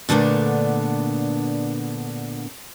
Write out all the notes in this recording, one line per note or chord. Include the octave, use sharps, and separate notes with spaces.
A#2 D3 A3 B3 D4